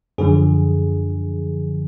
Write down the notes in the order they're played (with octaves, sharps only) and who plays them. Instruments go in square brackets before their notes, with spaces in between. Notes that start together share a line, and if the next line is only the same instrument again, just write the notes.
[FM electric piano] F#2 D3 F3 G#4